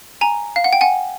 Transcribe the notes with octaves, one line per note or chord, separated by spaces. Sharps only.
G#5 A#5
F5
F#5
G5
F#5 G#5